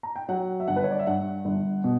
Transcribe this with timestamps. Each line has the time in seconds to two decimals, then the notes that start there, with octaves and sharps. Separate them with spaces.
0.03 A#5
0.16 G5
0.29 F#3 F#5
0.60 E5
0.67 G1 F#5
0.76 B4
0.84 C#5
0.91 D5
0.99 E5
1.07 G2 F#5
1.45 G1
1.84 B2